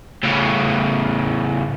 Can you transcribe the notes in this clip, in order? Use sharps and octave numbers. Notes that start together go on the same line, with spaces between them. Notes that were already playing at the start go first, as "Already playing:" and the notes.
A2 C#3